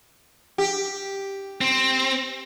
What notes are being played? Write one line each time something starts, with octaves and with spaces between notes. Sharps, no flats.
G4
C4